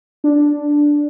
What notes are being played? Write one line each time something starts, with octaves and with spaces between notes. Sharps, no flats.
D4